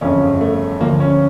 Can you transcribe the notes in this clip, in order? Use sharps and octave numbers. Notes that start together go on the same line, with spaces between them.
G1 F2 C#3 C#4
A3
D2 D3 F3 A#3
C#4